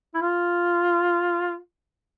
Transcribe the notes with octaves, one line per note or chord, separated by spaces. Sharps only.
E4
F4